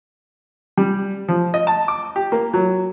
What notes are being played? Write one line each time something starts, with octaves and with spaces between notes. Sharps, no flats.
G3
F3
D#5
A5
D6
G4
A#3
F#3